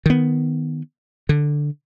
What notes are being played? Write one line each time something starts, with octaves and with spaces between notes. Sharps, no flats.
D#3 B3
D3